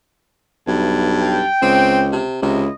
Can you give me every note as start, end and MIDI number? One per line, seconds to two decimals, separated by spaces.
0.67 1.40 35
0.67 1.45 43
1.23 2.07 79
1.62 2.23 37
1.62 2.04 60
2.12 2.38 48
2.42 2.68 37
2.42 2.63 48
2.42 2.73 64
2.42 2.73 75